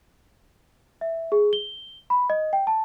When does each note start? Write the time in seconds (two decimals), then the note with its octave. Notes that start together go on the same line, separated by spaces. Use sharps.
1.01 E5
1.32 G#4
1.53 G7
2.10 B5
2.30 D#5
2.53 G5
2.67 A5